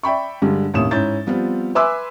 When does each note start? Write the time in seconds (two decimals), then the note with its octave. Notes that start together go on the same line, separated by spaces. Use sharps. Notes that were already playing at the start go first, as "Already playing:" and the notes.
0.03 D5 E5 G5 B5 C#6
0.42 G2 D3 G3 G#3
0.74 D#2 A2 C3 C#4 D#6 E7
0.91 G#2 C#4 E4 G6 A6
1.26 F3 G3 B3 C4 F4
1.75 B4 E5 G#5 C6 D6 E6